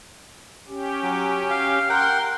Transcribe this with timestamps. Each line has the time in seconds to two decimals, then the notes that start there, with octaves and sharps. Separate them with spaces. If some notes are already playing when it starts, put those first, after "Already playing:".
0.68 C#4 G4
1.03 F#3
1.50 F5
1.89 A#4 F#5 G5 C6